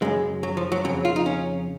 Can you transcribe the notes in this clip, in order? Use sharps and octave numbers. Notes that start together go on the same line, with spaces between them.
F#2 C#3 G#3
F#3
F3
F#3
F2 C#3 F#3
F4
D#4
C#4